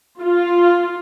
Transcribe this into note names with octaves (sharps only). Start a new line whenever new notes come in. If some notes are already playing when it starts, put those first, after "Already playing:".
F4